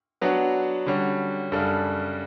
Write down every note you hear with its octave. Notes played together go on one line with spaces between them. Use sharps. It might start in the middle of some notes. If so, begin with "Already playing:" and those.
F#3 B3 D4 F#4
D3 G3 C#4 F#4
F#2 C#3 G3 D4 A4